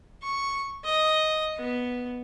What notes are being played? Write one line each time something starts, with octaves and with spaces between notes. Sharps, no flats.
C#6
D#5
B3